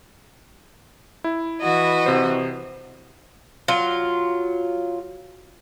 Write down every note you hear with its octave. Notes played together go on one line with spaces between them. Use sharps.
E4
E3 F#4 D#5
C3 C5
F#3 F4